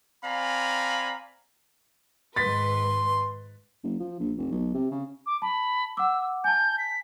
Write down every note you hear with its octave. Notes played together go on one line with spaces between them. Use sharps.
C4 D5 F5 G#5 A#5 B5
G#2 D#3 B4 C6 A6 B6
F#1
F3
A#1
F1
B1
C3
C#3
D6
A5 B5
F#5 D6 E6
G#5 A5 G6
B6